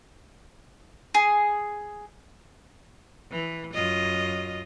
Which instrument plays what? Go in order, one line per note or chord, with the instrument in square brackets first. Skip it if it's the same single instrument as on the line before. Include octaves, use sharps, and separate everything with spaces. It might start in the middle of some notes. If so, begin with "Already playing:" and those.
[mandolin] G#4
[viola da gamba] E3
F#2 F4 D#5